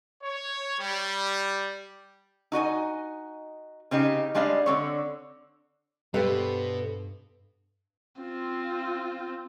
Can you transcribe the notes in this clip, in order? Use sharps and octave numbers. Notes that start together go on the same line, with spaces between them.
C#5
G3
D#4 F#4 D#5 G#5
C#3 C4 D#4 G4
G3 G#3 D4 D#5 F5
D3 C4 C#5
G2 B2 G4 A4 B4 C5 D5 F5
C4 F4